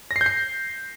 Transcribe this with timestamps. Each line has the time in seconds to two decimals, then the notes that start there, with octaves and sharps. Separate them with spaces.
0.11 A#6
0.16 C7
0.21 G6
0.26 C7